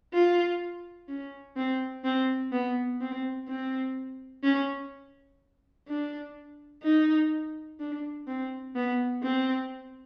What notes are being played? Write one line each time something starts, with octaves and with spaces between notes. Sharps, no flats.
F4
C#4
C4
C4
B3
C4
C4
C#4
D4
D#4
D4
C4
B3
C4